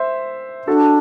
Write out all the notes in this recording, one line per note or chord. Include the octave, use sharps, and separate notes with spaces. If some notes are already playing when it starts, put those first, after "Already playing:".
Already playing: C5 E5
D4 F#4 A4